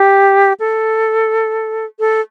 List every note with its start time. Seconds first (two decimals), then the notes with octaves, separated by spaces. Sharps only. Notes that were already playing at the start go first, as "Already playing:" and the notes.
Already playing: G4
0.60 A4
2.00 A4